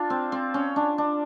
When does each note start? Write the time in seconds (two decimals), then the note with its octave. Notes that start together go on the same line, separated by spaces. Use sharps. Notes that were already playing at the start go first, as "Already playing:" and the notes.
Already playing: D4 F4
0.10 C4
0.32 C4
0.54 C#4
0.76 D4
0.98 D4